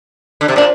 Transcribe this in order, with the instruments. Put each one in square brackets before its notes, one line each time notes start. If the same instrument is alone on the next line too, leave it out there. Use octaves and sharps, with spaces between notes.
[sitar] D3
C3
[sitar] A#2 [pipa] D4